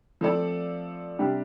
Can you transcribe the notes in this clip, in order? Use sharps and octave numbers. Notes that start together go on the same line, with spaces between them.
F3 A3 C4 A4 D5
C3 G3 D4 G4